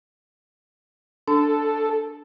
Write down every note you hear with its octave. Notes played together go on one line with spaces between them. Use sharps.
D4 A4